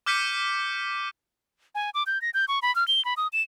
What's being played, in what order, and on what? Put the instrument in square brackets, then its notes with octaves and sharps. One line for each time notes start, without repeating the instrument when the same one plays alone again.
[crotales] D6 F6 G6 B6 C#7 D#7
[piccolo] G#5
D6
G6
A#6
G6
C#6
B5
F6
G7
B5
D#6
E7